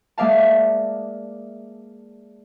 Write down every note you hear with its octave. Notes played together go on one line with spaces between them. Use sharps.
G#3 A#3 D5 E5 F5 A5